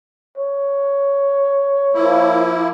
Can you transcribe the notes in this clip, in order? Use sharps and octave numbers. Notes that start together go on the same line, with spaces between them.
C#5
F3 A#3 E4